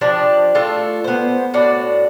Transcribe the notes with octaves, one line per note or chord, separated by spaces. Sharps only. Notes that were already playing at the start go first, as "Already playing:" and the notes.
F3 D4 G4 D5
A3 D4 F4 A4
B3 C5
A2 D4 F#4 D5